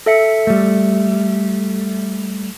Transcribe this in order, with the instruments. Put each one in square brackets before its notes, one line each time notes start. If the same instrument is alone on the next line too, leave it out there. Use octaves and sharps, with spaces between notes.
[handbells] A4 E5 C#7
[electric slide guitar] G3 A3